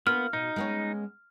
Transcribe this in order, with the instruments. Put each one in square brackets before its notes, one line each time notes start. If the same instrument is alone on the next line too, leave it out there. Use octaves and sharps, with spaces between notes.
[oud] A#3 D4 F4 [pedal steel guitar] B3 [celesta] F6
[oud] B2 [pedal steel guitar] D#4
[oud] G#3 B3 C#4